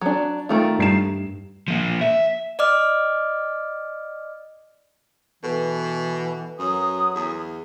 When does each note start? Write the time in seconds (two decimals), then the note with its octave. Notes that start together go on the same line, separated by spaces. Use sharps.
0.01 F#3 D4
0.49 D#3 A3 F4
0.78 G2 C7 E7
1.68 F3 A#3
2.01 E5
2.59 D5 D#5 D6 F6
5.43 B2 E3 A4 B4
6.59 F#2 F#3 D#6
7.15 E2